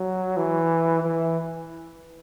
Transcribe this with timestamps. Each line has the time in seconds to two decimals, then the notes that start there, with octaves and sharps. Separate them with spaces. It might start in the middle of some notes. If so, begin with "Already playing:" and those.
Already playing: F#3
0.37 E3
1.03 E3